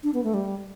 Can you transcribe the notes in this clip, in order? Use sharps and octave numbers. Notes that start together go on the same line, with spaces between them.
D4
B3
A3
G3